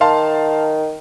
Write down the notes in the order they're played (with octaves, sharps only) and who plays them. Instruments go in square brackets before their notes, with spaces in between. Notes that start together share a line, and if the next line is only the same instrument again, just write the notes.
[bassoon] D#3 [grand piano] F5 A5 C6